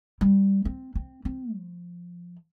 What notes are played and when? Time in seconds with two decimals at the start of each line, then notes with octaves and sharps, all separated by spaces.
0.21 G3
0.65 C4
0.95 C4
1.25 C4
1.55 F3